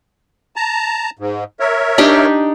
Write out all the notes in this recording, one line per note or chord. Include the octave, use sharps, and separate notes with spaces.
A5 A#5
G#2
A#4 C#5 E5
D4 D#4 G4